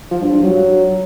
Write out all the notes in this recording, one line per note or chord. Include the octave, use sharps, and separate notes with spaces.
F3
G2
G2
F#3